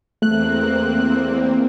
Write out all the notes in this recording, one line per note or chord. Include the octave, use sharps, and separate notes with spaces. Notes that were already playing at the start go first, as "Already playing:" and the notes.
E2 A3 A#3 C4 F#6